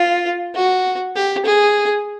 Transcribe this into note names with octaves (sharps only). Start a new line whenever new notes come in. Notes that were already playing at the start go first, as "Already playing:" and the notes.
Already playing: F4
F#4
G4
G#4